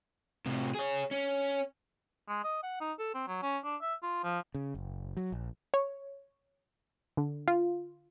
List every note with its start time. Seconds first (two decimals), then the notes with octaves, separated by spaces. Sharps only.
0.46 A2 C3
0.74 G#4 C#5
1.11 C#4
2.28 G#3
2.44 D#5
2.63 F#5
2.81 D#4
2.99 A4
3.14 C4
3.27 F#3
3.42 C#4
3.64 D4
3.81 E5
4.02 F4
4.24 F3
4.55 C#3
4.74 F#1
5.17 F#3
5.32 A#1
5.74 C#5
7.17 D3
7.48 F4